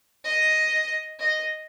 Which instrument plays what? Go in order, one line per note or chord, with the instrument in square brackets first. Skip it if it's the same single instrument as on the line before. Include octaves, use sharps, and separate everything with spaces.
[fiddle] D#5
D#5